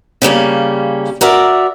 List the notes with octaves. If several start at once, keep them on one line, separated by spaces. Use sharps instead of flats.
C#3 G3 A#3 C#4
F#4 A#4 D5 E5